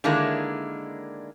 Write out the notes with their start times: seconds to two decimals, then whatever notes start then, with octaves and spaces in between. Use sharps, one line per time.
0.04 D3 D#3 G#3 A#3 D4 E4